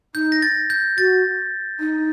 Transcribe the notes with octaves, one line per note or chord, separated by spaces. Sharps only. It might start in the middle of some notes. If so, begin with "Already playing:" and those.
D#4 G6
A#6
A6
G6
F#4 A6
D#4